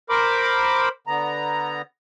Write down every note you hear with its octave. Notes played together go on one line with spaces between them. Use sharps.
A#4 C5 B5 D6
D3 B3 A#5